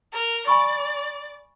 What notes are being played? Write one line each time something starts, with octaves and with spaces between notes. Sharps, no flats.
A#4
D5 G#5 B5 C#6